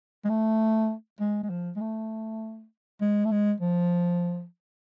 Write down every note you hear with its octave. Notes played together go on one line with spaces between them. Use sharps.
G#3
A3
G#3
G#3
F3
G#3
A3
G#3
A3
G#3
F3